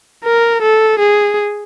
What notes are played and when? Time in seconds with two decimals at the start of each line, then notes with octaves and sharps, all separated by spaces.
0.24 A#4
0.62 A4
0.99 G#4